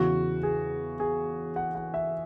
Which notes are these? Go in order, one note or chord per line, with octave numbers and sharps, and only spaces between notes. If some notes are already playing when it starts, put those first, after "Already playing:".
Already playing: E2 C#3 E3 F#4
G#4
G#4
F#5
F#5
E5